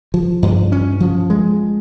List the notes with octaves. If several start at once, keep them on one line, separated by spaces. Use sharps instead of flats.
F3
G2
C#4
F3
G#3